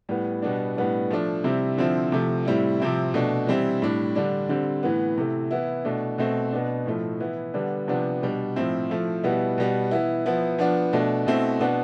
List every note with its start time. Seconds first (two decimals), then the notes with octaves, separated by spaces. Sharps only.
0.09 A2 G3 B3
0.42 B2 G3 B3 D4
0.76 A2 G3 B3 D4
1.11 F3 A3 D4
1.44 C3 G3 C4 E4
1.78 D3 F3 C4 E4
2.12 C3 F3 A3
2.45 A2 G3 C4 E4
2.80 C3 F3 C4 E4
3.14 B2 A3 D4
3.47 E3 G3 C4 E4
3.82 A2 G3 D4
4.15 D3 G3 D4
4.49 D3 G3 C4
4.83 A2 E3 B3
5.17 C3 E3 A3
5.51 E3 B3 E4
5.85 B2 A3 D4
6.18 B2 A3 C4
6.53 B2 B3 D4
6.86 A2 F3 A3
7.20 E3 B3 E4
7.54 D3 G3 B3 D4
7.87 C3 F3 B3 D4
8.22 B2 G3 D4
8.56 A2 F3 C4 E4
8.89 F3 A3 E4
9.23 B2 G3 B3 E4
9.58 B2 G3 B3
9.91 E3 B3 E4
10.26 F3 B3 E4
10.59 F3 B3 D4
10.93 B2 A3 D4
11.27 B2 A3 C4 E4
11.60 B2 B3 D4